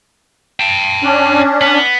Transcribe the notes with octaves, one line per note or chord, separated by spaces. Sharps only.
G5 A5
C#4 D4
B3